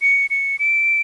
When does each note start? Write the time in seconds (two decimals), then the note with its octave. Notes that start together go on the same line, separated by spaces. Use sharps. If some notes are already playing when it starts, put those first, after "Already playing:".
0.02 C#7
0.30 C#7
0.59 D7